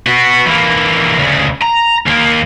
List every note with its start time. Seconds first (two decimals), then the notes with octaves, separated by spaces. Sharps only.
0.07 B3 F#4
0.45 E3 A#3
1.19 D2 C#3
1.62 A#5
2.07 D#2 A#3